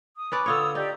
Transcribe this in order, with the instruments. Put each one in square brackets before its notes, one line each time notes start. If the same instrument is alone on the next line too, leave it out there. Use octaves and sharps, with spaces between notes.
[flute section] D#6
[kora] C#4 B4 D5
[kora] D3 F4 C#5 [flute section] D#6 E6
[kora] D#4 [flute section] G4 D5 G6